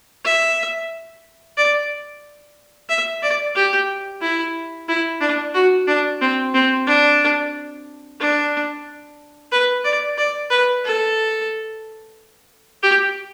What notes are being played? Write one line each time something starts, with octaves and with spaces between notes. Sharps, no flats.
E5
D5
E5
D5
G4
E4
E4
D4
F#4
D4
C4
C4
D4
D4
B4
D5
D5
B4
A4
G4